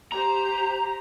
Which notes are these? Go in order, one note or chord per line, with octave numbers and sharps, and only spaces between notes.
G4 C5 A#5